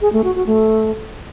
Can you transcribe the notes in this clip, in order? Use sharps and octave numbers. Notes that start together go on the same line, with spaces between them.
G#4
A3
F#4
F#4
A3